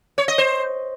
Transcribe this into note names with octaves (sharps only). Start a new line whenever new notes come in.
C#5
D#5
C5